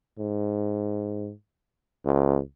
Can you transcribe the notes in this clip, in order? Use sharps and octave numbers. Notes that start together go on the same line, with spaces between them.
G#2
C#2